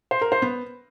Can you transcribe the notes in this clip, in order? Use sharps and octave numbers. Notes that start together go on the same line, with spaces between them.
C5
A#4
C5
B3